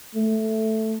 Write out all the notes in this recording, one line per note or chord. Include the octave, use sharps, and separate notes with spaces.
A3